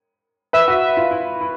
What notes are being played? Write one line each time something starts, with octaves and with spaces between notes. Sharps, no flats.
B4 E5
F#4
F4
E4
E4